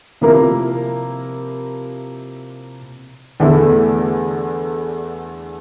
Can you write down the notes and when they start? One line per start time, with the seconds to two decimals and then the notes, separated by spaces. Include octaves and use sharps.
0.21 C3 F3 A#3 E4 A#4
3.40 E2 D3 A3 E4 A4